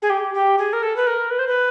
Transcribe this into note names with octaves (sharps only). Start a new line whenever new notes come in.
G#4
G4
G4
G#4
A#4
A4
B4
A#4
B4
C5
B4